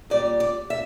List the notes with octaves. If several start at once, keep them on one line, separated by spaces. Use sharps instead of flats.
A#2 G3 D5
D5
E5